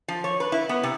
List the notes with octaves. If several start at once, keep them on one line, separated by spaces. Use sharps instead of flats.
F3
C#5
B4
E4
B3
C3